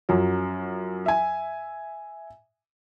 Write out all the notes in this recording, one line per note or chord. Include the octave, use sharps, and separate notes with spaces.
F#2 F3 F#3 C#4
E5 G#5